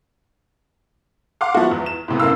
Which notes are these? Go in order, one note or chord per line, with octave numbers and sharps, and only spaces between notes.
F5 F#5 C6 D6 F6
F3 B3 E4 F#4
E2
E7
A2 C3 B3
F1 F#2 A2 A#4 F5 E6